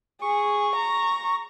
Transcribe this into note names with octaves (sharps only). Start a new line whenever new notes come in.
G#4 C#6
A#5